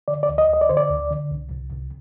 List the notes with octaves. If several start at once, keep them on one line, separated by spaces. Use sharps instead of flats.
D3 D5
D5
D2
D#5
D2 D#5
D5
D3 C5
D5
D2
D3
C2
C2
C2